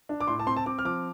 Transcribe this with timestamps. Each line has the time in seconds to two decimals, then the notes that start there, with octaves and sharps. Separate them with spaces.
0.09 D4
0.21 D6
0.27 A2 C6
0.39 A5
0.46 C4 C6
0.57 A5
0.66 C4 D6
0.79 F6
0.85 F3 D6